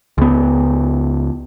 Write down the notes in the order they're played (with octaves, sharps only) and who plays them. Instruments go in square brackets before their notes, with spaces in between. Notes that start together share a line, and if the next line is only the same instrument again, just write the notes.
[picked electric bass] C#2 B3